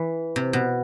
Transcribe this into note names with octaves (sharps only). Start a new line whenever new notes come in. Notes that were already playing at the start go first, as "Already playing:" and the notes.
Already playing: E3
C3
B2